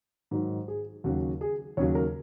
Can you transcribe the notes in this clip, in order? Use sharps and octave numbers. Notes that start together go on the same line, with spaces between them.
G#2 D#3 F#3
G#4
D#2 C#3 F#3 F#4
G#4
D#2 C#3 F#3 C#5
A#4